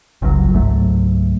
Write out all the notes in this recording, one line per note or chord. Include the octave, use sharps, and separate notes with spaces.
G1 C#2 C3 F#3
C#2 G#2 F#3 A3